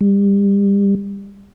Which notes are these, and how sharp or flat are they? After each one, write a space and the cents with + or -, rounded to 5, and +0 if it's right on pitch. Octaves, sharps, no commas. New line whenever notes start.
G3 +30